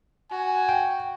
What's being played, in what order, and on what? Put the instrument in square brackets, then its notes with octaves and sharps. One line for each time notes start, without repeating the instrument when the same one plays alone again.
[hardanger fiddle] F#4 [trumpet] G#5
[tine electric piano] G5